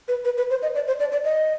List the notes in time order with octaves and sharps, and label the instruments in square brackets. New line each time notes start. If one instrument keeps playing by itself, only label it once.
[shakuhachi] B4
B4
B4
C5
D#5
D5
C5
D5
D5
D#5